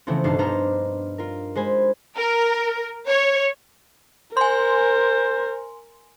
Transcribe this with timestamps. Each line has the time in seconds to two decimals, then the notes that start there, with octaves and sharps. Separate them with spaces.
0.07 C#3 E3 F3 A3 B3 C4
0.24 B1 G2 D4 D#4 A6 C7
0.39 B3 D4 D#4 C5 A#5 F6
1.18 F4 A#4
1.55 G#3 C5 G#5 B5
2.17 A#4
3.07 C#5
4.37 A#4 C5 G#5 C6